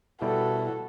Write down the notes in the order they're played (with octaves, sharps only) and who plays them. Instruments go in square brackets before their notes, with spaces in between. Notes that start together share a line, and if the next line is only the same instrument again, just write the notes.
[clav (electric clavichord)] B2 G3 [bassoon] E4 [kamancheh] F#4 A4